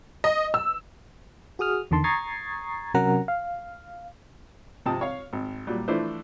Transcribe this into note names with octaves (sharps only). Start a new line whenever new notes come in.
D#5
E6
F#4 G#4 D#6 F6
E2 D3 D#3 A5 C6
A#5 C#6 D#6 G#6 A6 C7
C3 F#3 C#4 A#4 F#5 A#5
F5
G#1 C3 F3 G5 A5 D#6
C#5 F5
G#1
A#2 F#3 G3
E3 F3 A3 D4 E4 C5